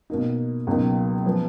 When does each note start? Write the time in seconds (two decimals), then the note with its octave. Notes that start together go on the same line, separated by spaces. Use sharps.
0.10 B2 A#3 D#4
0.67 C#2 B2 F#3 A#3 D#4
1.26 F3 G#3 B3